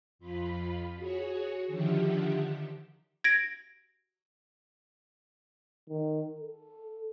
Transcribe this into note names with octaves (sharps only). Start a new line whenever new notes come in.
F2 F4 B5
F#4 G#4 C#5
D3 D#3 F3 G4 E5 F#5
G#6 A#6 D7
D#3
A4